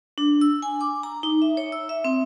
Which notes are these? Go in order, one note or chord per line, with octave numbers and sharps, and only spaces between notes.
D4
E6
G#5
D6
A#5
D#4
E5
C#5
E6
E5
C4